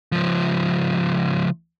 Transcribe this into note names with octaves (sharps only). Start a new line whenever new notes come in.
C#2 F3